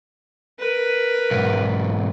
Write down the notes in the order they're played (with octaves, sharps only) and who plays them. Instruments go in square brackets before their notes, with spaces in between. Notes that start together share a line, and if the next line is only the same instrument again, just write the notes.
[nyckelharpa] A#4 B4
[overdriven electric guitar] B1 G#2